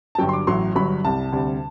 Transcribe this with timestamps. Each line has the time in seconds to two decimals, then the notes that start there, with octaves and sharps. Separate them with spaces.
0.15 A5
0.19 G1 G2 F#3 G5
0.29 C6
0.33 D6
0.47 A1 A2 F#3 C6
0.76 G1 G2 F#3 B5
1.04 C2 C3 G3 A5
1.32 D2 C3 G3